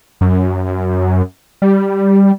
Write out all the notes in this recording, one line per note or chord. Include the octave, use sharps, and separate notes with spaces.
F#2
G3